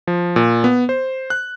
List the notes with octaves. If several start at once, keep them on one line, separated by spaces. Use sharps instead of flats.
F3
A#2
B3
C5
F#6